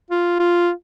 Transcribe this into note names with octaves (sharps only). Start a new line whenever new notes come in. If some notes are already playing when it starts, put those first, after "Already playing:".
F4
F4